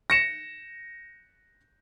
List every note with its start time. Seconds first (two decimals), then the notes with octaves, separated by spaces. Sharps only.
0.10 A#6 C#7 E7